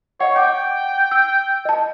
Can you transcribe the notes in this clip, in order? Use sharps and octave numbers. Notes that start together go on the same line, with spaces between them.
C#5 D#5 F#5
F#5 G5 D6
E6
D#5 A5